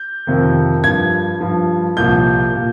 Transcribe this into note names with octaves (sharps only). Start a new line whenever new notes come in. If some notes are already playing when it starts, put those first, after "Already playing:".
Already playing: G6
F2 C3 D#3
G2 F3 G#6
G2 F3
C2 A#2 F3 G6
A#2